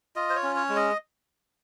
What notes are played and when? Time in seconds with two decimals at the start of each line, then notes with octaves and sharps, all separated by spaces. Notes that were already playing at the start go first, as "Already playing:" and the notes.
0.16 F4 D#5
0.30 C5
0.36 C#5
0.43 C#4
0.56 C#5
0.69 G#3
0.76 D#5